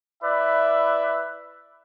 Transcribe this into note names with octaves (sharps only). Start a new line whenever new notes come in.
E4 B4 D5 E5